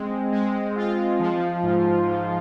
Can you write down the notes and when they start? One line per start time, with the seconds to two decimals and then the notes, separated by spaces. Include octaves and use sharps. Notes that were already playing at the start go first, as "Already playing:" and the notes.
Already playing: G#3 C4
0.32 G#3
0.76 F4
1.19 F3
1.63 G#2
2.07 G#2